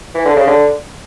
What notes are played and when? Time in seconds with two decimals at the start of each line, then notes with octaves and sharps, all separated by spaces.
0.15 E3
0.25 D3
0.36 C#3
0.47 D3